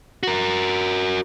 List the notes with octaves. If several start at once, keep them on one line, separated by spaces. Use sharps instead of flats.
F#4 A#4